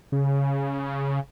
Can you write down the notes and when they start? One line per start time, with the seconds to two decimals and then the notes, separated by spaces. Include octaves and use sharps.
0.12 C#3